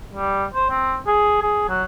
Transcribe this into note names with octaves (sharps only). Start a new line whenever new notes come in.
G3
C5
C4
G#4
G#4
F#3